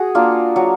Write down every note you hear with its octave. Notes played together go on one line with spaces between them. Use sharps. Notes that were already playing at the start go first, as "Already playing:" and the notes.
Already playing: F#4 G#4
A#3 D4 F4
F#3